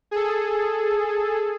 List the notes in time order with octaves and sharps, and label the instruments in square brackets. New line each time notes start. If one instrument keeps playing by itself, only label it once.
[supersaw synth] G#4 A4